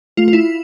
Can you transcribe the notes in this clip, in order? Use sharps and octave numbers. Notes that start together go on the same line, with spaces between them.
A3 F4
F4
E4